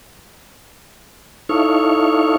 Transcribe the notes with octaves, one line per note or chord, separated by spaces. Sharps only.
D#4 E4 A4 C#5 F5 C#6